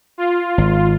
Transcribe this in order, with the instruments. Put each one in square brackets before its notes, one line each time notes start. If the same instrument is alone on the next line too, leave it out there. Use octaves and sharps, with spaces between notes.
[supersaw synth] F4
[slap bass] G#1